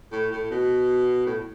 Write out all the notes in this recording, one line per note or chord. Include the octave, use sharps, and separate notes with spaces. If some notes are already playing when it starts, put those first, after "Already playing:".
A2
A2
B2
A2